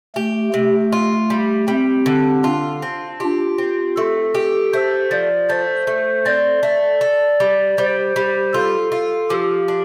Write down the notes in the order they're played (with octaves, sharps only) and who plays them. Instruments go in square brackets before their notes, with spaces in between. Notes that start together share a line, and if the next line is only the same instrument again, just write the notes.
[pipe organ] A3 [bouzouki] G4
[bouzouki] C3 [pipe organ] A3
[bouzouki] F4
G3
[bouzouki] G3 [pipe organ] C4
[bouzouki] D3
[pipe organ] D4 [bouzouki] F4
[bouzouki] C4
[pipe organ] F4 [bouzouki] G4
[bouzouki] C4
[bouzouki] A3 [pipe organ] A4
[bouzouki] G4
[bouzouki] A3 [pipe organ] C5
[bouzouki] F3 [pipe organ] D5
[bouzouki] A3 [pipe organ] C5
[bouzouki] A3
[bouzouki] C4 [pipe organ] D5
[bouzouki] A3
A4
G3
[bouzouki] G3 [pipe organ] C5
[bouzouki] G3
[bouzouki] F4 [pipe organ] A4
[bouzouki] F4
[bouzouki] F3 [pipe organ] G4
[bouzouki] D4